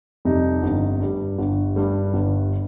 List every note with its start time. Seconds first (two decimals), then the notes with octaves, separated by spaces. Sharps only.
0.25 F2 C3 G3 D#4
0.63 G1
1.00 G2 G3
1.39 G1
1.76 G2 G3
2.14 G1